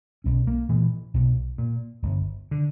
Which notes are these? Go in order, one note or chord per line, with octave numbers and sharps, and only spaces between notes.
B1 C#4
A#3
A#2 E3
B1
A#2
G1
D3